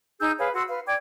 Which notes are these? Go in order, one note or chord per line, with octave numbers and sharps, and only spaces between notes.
D#4 G#4 E6 G6
G#4 B4 C#5 F5
F#4 C6 E6
B4 F5
D5 G5 D6 G#6